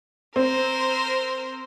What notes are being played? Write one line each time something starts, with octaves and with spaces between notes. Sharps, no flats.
C4 A#4 C5